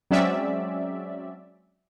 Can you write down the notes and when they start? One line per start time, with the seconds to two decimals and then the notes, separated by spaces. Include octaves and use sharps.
0.11 F#3 G#3 C4 C#4 D5 E5